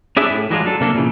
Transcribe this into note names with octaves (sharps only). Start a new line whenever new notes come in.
C#4 D4 E4 G#4 E5
A2
E3 F#3 G#3 D4 F4
F#3 D4 A4
C3 A#3 D4 A4
A#2 C#3 E3